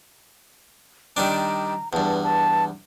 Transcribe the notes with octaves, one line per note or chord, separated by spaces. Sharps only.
D#3 G3 D4 A#5
E2 G2 A5
A5